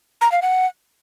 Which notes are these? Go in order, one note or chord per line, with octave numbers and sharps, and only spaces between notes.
A#5
F5
F#5